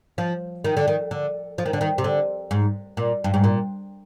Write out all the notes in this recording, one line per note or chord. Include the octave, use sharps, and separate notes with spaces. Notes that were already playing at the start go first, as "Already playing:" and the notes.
F3
D#3
D3
D#3
D3
F3
D#3
D3
D#3
C3
D3
G#2
A#2
G2
G#2
A#2